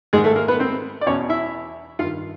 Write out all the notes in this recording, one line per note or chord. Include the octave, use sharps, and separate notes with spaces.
G#2 D#3 G#3 G#4
A3 A4
A#3 A#4
B3 B4
C4 C5
D5
E2 B2 C#4 C#5
E4 E5
G2 D#3 F4 F5